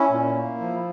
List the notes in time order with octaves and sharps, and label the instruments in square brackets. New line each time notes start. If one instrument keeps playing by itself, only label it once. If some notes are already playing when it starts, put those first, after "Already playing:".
Already playing: [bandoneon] C#4 E4
A#2
A#3
F3